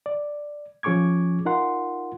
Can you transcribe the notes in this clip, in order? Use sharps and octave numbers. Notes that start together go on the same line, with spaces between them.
D5
F3 C#4 G#4 C#6 D6 G#6
D#4 F4 A#4 F#5 C6